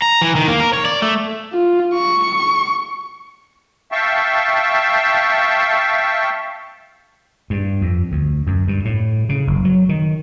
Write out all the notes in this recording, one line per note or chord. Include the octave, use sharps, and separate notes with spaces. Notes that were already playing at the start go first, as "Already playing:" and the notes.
A#5
E3
D#3
A#3
A#4
C#5
D5
A3
F4
C#6
E5 F5 G5 A5 C#6
G2
F2
D2
F#2
G2
A2
C#3
F#1
F#3
D#3